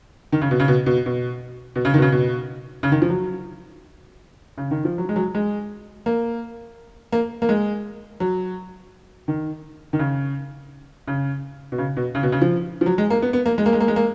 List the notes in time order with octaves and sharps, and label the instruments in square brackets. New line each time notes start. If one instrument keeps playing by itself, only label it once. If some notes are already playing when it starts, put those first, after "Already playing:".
[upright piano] D#3
C#3
B2
C#3
B2
B2
B2
B2
C#3
D#3
B2
C#3
B2
C#3
D#3
F3
F#3
C#3
D#3
F3
F#3
G#3
F#3
G#3
A#3
A#3
A#3
G#3
F#3
D#3
D#3
C#3
C#3
B2
C#3
B2
C#3
B2
C#3
F3
F3
F#3
G#3
A#3
B3
B3
A#3
G#3
A#3
G#3
A#3
G#3
A#3